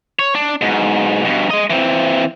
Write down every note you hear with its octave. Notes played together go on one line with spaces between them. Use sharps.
C#5
D4
G#2 B2
G2 B2
G#3 D#5
E3 C4